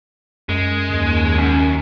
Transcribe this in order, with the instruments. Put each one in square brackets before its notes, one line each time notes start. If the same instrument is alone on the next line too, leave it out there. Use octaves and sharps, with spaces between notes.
[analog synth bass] F#2 [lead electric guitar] G#3
[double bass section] D#2
[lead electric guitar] F#2 [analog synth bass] C#4